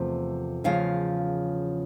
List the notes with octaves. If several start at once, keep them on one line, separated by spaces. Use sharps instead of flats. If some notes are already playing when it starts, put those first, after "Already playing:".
Already playing: E2 C3 F3 A3
E2 C#3 F3 F5